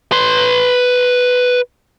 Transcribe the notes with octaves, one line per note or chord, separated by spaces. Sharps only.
B4 C6